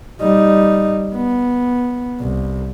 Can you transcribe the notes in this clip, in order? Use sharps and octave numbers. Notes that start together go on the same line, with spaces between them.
G3 D#4
B3
C2